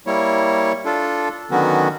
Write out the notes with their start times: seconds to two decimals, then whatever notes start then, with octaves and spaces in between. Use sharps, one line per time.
0.07 G3 A#3 E4 C#5
0.85 D4 F4 A4
1.51 D3 D#3 F#3 B3 C#4 F#4